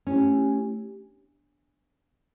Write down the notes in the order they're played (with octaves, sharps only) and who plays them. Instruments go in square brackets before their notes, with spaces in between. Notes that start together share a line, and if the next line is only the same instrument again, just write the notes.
[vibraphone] A3 E4 G4 [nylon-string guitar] C#4